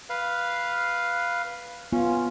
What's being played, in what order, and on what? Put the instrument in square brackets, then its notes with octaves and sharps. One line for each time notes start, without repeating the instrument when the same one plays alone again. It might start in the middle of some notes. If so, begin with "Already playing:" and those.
[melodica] B4 F5
[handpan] B3 F4 [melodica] C#4